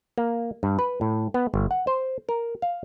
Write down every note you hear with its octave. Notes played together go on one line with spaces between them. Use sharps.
A#3
G2
B4
A2
B3
G1
F#5
C5
A#4
F5